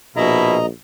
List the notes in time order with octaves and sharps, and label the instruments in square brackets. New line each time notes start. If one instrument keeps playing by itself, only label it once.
[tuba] A#1 [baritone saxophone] B2 [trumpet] E4 [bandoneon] D#5 A#5